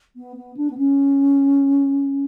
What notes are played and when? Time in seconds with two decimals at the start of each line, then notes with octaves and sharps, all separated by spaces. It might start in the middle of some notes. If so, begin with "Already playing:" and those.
0.16 B3
0.36 B3
0.57 D4
0.70 B3
0.78 C#4